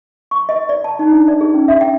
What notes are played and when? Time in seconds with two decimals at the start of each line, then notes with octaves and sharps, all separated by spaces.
0.31 C#6
0.49 D#5
0.69 D5
0.84 A5
0.99 D#4
1.13 D4
1.28 D5
1.41 G#4
1.54 C#4
1.68 E5
1.81 G5